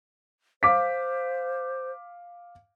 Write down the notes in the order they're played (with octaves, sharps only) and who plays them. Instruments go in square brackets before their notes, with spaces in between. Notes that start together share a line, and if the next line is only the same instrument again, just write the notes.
[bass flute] C5 [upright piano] F5 D6 B6